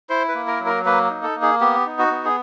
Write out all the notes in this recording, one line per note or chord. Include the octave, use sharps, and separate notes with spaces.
E4 C5
B4
A#3
A#4
F#3
A#4
A#3 B4
D#4
A4
A#3
G#4
B3 G4
D#4
F#4
B3
G#4